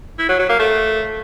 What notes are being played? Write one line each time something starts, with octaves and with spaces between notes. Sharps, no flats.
E4
F#3
F#3
A#3
A3